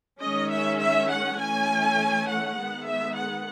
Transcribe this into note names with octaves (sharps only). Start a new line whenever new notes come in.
D#3 G#3 C#4 D#5
E5
E5
F#5
E3 A3 C#4 G#5
F#5
D#3 G#3 B3
E5
F#5